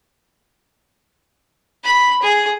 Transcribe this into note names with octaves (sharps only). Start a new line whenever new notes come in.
B5
G#4